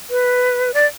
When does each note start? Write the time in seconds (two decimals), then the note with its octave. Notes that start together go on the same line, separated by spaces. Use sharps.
0.10 B4
0.74 D5